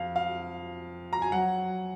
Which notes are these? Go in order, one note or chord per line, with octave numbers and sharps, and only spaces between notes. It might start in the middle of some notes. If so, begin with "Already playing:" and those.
Already playing: F2 F5
F5
A#5
G#5
F#3 F#5